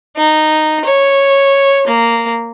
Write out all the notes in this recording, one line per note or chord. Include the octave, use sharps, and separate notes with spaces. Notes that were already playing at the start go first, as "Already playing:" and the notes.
D#4
C#5
A#3